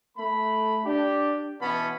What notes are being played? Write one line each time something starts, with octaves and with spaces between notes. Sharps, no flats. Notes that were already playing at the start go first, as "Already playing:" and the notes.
A3 B5
D4 G4
B2 E3 B3 C#4 A5 B5